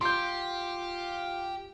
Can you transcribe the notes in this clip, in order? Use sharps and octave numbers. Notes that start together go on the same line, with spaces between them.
F4 G4 C6 G6